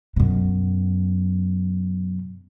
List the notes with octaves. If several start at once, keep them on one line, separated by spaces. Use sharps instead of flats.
F#2 B2